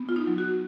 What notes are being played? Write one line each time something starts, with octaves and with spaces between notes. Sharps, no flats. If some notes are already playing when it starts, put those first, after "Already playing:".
Already playing: B3
F4
D#4
F#3
F#4